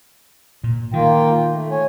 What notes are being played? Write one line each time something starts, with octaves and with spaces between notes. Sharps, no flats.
A#2
D#3 A#3 F4 G5
A3
C#5 G#5